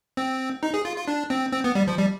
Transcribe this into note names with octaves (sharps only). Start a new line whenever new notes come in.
C4
D#4
G#4
F4
F4
D4
C4
C4
B3
G3
F3
G3